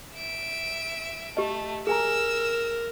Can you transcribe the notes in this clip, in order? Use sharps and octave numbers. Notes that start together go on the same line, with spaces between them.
E5 D7
A3 G4 D#5
G#4 A#4 G#5 A#5 E6